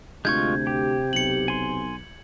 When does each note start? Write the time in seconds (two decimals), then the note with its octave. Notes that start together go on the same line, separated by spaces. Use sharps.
0.25 D2 C3 G#3 F4 C#6 G6 G#6
0.67 G4
1.13 B1 C#7 F#7
1.48 G#5 C6